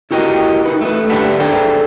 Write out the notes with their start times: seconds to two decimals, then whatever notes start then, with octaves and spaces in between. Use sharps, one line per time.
0.11 E4 F#4 G4 A#4 D#5 G5
0.66 D#4 B4
0.81 A3 B4
1.10 D3 D4 G4 B4 E5 F#5
1.40 D4 G#4 A4 C5 G5